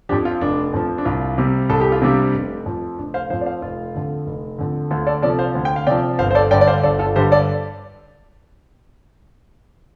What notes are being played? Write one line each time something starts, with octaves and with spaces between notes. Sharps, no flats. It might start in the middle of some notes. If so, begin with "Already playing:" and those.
F2 F3 D4 G4
F4
F1 D4
F2 F3
D4
C2 F4
C3 G3
C2 A4
G4
F4
C3 G3 D4 G4
F1
F2 F3
F1 D4
C5 F5
F2 F3 C5 F5
D5
C5 F5
F1 F4
F2 D3
F1
F2 D3
D2 F4 A4
A4 D5
C3 F3 A4 D5
C5 F5
D2
G5
F5
C3 F3 D5 G5
G1 C5 F5
C5
A4 D5
G2 D3 D5 G5
D5
C5 F5
G1 A4 D5
F4 A4
G2 D3 G4 C5
A4 D5